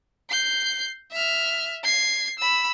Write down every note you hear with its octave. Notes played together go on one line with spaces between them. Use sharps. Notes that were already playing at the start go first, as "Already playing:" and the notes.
G6 C7
E5 F6
G#6 C7
B5 E6